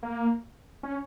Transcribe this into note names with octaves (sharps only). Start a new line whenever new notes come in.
A#3
C#4